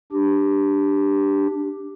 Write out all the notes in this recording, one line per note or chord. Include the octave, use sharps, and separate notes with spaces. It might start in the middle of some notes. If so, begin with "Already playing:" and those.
D4 G4